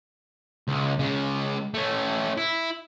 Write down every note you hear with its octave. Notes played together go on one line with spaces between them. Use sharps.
C#2
C#3 G#3
A3 C#4
E4